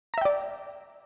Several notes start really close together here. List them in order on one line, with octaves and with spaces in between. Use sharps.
A#5 E5 G5 D5